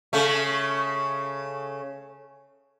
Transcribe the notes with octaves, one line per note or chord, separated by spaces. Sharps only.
C#3 A3